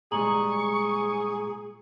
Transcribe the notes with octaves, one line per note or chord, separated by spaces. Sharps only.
A#2 G3 G#3 G#4 A#5 C#6 F#7